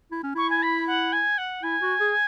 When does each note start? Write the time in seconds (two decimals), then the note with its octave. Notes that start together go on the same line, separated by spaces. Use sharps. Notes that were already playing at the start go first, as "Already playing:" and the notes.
0.11 E4
0.23 C#4
0.35 E4 C#6
0.50 G#5
0.62 B5
0.87 F#5
1.12 G#5
1.38 F#5
1.63 E4 G#5
1.82 F#4
2.00 G#4